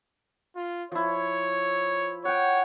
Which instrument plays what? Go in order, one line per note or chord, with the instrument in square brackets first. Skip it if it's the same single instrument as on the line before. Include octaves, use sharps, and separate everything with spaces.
[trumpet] F4
[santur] F3 E4 [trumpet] C#5
[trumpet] C#5 [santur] F#5 G5